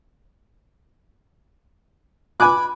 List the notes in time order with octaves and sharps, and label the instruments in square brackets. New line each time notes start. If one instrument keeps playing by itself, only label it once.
[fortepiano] G#5 D6 F#6 [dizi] B5